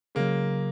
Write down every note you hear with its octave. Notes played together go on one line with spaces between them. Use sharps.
C#3 F#3 G#3 A#3